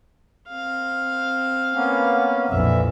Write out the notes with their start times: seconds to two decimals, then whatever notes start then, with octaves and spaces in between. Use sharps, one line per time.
0.49 C4 F5
1.73 A#3 B3 C#4
2.50 A#1 F2 D3 E3 E5